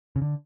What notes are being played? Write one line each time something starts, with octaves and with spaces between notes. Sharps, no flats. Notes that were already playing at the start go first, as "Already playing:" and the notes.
C#3
D3